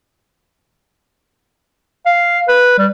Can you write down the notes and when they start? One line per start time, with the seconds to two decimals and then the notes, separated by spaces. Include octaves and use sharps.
2.06 F5
2.49 B4
2.78 G3